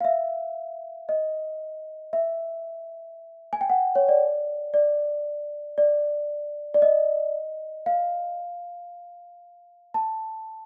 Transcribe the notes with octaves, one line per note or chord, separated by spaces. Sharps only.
F5
E5
D#5
E5
G#5
G5
F#5
C#5
D5
D5
D5
D5
D#5
F5
A5